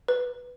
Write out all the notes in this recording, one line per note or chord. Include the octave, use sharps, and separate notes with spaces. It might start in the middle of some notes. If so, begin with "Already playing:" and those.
B4